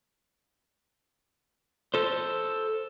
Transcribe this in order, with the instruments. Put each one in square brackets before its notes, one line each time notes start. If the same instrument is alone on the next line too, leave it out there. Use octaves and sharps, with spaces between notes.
[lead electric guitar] A4 C5